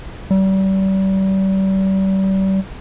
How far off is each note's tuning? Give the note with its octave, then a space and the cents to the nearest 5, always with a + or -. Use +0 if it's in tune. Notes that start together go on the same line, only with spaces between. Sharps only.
G3 -35